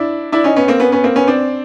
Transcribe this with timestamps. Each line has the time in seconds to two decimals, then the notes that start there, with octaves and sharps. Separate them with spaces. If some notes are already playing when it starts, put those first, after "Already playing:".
Already playing: D4 E4
0.32 D4 E4
0.44 C#4 D#4
0.56 B3 C#4
0.68 A#3 C4
0.80 B3 C#4
0.92 B3 C#4
1.04 A#3 C4
1.16 B3 C#4
1.28 C4 D4